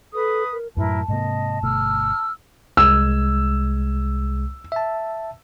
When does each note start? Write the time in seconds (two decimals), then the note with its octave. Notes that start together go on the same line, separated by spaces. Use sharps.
0.13 A4 B4 D#6
0.52 A#4
0.77 F#2 A2 F#3 E4 A#4 B4 A5
1.08 G#2 C3 A#3 D#5
1.62 G1 B2 A3 E6 F6
2.77 C2 G#3 E6 G#6
4.72 E5 A5